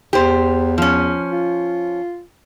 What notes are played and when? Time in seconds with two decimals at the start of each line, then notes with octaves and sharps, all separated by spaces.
0.13 E2 G4 C5
0.78 F3 C#4
1.32 F4